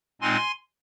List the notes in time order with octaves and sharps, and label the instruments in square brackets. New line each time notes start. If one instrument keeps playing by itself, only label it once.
[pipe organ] A#2 G#3 C4 D#4 G#5 C6